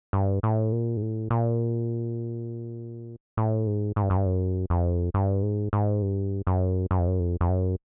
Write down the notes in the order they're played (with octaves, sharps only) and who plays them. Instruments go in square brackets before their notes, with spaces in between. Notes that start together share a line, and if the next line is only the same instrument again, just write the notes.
[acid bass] G2
A2
A#2
G#2
A2
A#2
A2
G#2
G#2
G2
F#2
G2
F#2
F2
G2
G#2
G#2
G2
F#2
F#2
F2
F#2
F2
F2
F#2